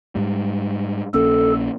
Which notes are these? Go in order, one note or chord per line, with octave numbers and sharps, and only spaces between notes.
G#2 G3
A#1 A#3 C#4 A4